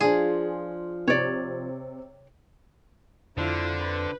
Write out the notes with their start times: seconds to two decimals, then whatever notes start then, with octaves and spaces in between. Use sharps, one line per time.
0.01 F3 D4 F4 G#4
1.08 C3 C#5 D5
3.38 F2 D3 D4 E4 F4 C5
3.79 B4